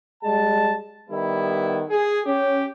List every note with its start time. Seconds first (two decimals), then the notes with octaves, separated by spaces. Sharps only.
0.23 G3 G#3 A5
1.10 D#3 G3 B3 E4
1.90 G#4
2.26 C#4 G4